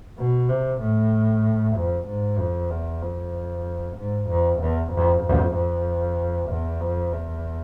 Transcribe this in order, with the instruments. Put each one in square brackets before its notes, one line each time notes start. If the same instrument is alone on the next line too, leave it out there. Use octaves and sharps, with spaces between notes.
[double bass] B2
C3
A2
F2
G#2
F2
E2
F2
G#2
F2
E2
F2
F2
F2
E2
F2
E2